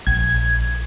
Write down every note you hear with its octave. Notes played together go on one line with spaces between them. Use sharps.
A#1 G#6